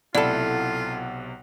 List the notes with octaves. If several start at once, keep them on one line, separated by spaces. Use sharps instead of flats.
B1 C3 E4 F4 A4 D5 F#5